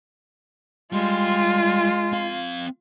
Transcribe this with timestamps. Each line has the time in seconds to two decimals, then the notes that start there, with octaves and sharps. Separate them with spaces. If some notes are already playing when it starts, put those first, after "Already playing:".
0.93 G3 G#3 F4
2.12 C4 F5